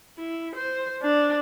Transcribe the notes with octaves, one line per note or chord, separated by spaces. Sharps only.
E4
C5
D4